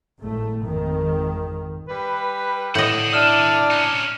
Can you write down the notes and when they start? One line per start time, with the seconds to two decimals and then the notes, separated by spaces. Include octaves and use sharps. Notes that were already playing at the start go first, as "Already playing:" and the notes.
0.18 G#1 A2 A3
0.61 G#1 F2 D#3
1.88 G3 B4
2.75 A2 A4 D#5 F#5 G6
3.13 D4 E4 D5 D#6 F6 E7
3.71 C#4 D#4